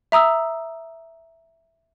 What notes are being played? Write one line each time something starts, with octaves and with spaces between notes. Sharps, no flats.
E5 A#5 D#6 E6